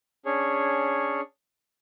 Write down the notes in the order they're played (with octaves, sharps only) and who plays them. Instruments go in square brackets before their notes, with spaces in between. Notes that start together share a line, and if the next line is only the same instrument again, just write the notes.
[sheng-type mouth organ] C#4 D4 G#4 C#5